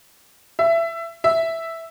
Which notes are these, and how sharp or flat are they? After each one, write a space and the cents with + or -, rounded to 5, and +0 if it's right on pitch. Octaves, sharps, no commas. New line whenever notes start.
E5 +20
E5 +0